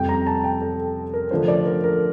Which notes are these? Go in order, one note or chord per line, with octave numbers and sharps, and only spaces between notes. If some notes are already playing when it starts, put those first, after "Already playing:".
Already playing: F2 C3 G3 C4 G5
A#5
A5
G5
A4
A#4
D3 F3 A3 D4 F4 C5
D5
A#4
A#4